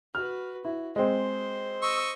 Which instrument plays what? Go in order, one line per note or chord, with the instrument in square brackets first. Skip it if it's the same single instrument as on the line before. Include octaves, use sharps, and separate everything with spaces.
[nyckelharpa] F#4 B4 [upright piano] F6
[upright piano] E4 [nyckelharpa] F#4
[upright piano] G#3 C4 [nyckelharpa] C5
[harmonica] D#5 C#6 E6